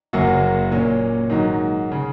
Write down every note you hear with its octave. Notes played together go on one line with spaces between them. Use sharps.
F#1 F#2 F#3 A#3 F#4
A#2 A#3 C#4
G#2 D#3 F#3
C#3